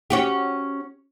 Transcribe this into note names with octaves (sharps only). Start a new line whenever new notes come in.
C#4 F#4 G4